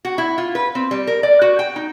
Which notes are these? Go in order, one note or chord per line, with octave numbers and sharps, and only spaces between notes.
F#4
E4
F4
B4
C4
G3
A#4
D5
F#4
G5
D#4